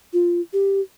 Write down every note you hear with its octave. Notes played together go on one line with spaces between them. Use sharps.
F4
G4